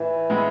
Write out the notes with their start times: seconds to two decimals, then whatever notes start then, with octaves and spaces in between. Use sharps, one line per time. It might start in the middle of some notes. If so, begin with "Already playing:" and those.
Already playing: A2 E3
0.30 A2 G#3 B3 E4